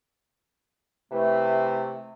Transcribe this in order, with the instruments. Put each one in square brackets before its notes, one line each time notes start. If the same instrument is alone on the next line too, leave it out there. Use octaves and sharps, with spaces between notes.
[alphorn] C3 [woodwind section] E3 A3